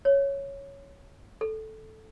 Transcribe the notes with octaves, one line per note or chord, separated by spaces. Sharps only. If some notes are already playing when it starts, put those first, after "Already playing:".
C#5
A4